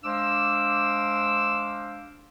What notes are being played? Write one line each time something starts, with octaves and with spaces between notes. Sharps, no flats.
G#3 D4 C5 F5 D6 E6